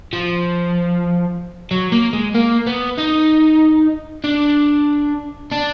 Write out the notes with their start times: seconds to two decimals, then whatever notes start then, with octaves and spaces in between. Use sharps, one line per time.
0.13 F3
1.71 F#3
1.92 A#3
2.13 G#3
2.35 A#3
2.67 B3
2.98 D#4
4.24 D4
5.52 D4